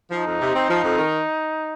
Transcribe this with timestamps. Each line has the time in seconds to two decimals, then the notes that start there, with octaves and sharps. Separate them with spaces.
0.11 F3 D#4
0.26 F2
0.41 C3
0.55 C4
0.69 F3
0.83 F2
0.98 D#3